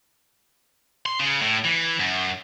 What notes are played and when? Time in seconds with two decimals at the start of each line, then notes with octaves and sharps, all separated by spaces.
1.06 C6
1.20 C#3
1.42 A2
1.64 E3
2.00 F#2